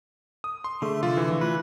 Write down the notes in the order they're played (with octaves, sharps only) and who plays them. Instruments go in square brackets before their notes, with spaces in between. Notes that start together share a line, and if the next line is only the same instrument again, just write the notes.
[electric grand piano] D#6
C6
[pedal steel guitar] D3 A3 [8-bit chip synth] G#4 E5
[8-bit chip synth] C3 F3 [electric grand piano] F4
[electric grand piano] E3
[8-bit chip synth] F4 [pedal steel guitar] B4